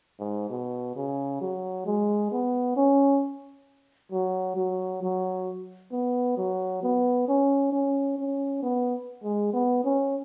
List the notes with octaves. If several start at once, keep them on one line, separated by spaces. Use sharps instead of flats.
G#2
B2
C#3
F#3
G#3
B3
C#4
F#3
F#3
F#3
B3
F#3
B3
C#4
C#4
C#4
B3
G#3
B3
C#4